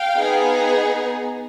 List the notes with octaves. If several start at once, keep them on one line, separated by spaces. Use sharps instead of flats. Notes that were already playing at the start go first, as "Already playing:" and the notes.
Already playing: F5 G5
B3 D#4 G#4